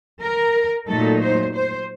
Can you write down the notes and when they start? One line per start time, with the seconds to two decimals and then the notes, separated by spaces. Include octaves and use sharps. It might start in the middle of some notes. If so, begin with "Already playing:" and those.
0.20 A#4
0.87 A#2 F#3 A3 D#4 A4
1.20 C5
1.53 C5